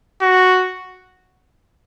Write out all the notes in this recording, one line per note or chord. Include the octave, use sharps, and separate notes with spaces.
F#4